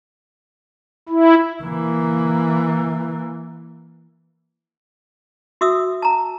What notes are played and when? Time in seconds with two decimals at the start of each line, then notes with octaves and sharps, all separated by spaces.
1.09 E4
1.64 E3 A#3
5.61 F#4 E5 D#6 E6
6.02 A5 A#5